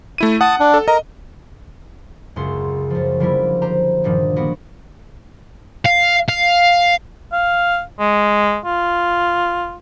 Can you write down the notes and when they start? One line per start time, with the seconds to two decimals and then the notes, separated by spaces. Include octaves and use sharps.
0.18 A3 E4 D#7
0.41 F#5 A5 D#6
0.60 D4
0.74 A4
0.88 A#4 D#5
2.36 C#2 F#2 C#3 F#5 C6
2.90 F#2 F3
3.20 D3 F3 G3 A#3 E4 A#4
3.62 G4 C5 A#5
4.04 G2 A#2 D3 D#3 F3
4.36 A#3 B3 F#4
5.85 F5
6.28 F5
7.32 F5
8.00 G#3
8.65 F4